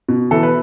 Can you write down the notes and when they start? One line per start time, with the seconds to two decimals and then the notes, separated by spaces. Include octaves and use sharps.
0.08 B2
0.31 E3 A4
0.43 B4